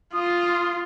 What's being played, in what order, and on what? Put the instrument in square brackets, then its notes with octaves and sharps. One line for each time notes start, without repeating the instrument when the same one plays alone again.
[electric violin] F4 [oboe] D#6